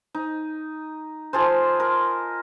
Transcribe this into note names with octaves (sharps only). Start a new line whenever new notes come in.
D#4
F4 G#4 A4 C5
A#4